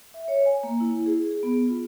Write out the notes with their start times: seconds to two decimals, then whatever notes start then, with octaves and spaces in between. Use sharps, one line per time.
0.14 E5
0.28 C#5
0.46 G#5
0.63 A#3
0.80 E4
1.06 G#4
1.31 G#4
1.43 B3
1.68 F4